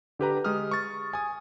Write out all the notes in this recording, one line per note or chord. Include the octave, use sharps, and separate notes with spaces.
D3 G4 B4 A#5
G#3 G4 D#6 F6
C#6 A6
G#5 D#6